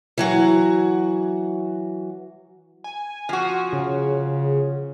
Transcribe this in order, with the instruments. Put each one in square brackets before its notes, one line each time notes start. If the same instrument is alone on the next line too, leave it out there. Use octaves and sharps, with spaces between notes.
[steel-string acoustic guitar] E3 F#3 F#4
[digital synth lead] G#5
[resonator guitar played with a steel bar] F3 F#4
[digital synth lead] C#3